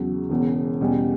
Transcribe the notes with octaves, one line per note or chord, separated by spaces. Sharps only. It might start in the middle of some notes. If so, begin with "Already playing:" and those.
Already playing: E2 C#3 F#3
E1 E2 C#3
E2 B2 G3 C#4